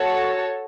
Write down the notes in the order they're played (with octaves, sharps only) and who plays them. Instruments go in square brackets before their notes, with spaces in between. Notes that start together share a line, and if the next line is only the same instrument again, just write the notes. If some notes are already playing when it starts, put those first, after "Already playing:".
Already playing: [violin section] F#4 A4 C#5 A5